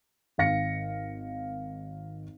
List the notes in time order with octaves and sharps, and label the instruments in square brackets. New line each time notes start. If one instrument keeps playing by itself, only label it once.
[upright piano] G#1 F5 A#6 C#7